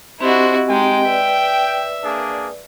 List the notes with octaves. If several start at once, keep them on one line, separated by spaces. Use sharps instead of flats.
C4 D4 E4 F#4 G4 C5 D#5
G#3 D#4 G5
B4 D5 E5
A#3 D4 G#4